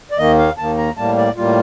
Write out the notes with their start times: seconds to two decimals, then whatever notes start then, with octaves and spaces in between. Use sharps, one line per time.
0.11 D5
0.18 D#2 D#3 A#3 D#5
0.39 F5
0.58 D#2 D#3 A#3 A5
0.78 A#5
0.97 A2 G3 A#3 A5
1.18 D5
1.37 A2 G3 A#3 F4